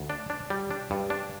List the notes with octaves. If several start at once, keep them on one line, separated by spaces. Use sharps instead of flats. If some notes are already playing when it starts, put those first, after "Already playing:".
Already playing: D2
D4
D4
G3
D4
G2
D4